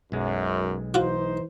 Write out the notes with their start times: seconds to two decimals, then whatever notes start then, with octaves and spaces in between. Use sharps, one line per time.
0.12 B1 F#2 G#3
0.94 E3 D#4 F4 F#4 C5